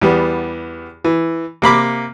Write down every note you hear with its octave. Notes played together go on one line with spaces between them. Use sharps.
E2 G3 B3
E3
C3 A#3 B5 D6